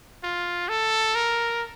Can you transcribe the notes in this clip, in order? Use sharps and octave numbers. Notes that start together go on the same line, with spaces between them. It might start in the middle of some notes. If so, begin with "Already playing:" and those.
F4
A4
A#4